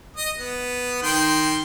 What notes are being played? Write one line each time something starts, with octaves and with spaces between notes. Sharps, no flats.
D#5
B3
D#3 G5 C6